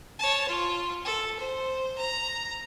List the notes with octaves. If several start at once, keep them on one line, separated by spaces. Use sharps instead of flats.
C#5 A5
F4
A4
C5
A#5